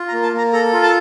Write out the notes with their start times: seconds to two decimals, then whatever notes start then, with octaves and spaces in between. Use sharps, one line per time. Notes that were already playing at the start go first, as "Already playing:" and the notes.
Already playing: F4
0.08 A#5
0.13 A#3
0.23 A5
0.33 A#3 A#5
0.53 A4 A#5
0.73 F4
0.83 A5